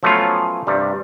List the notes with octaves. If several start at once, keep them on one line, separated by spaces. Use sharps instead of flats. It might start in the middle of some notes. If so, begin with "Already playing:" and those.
F3 F#3 A3 B3 C#4 F4
G2 C3 G3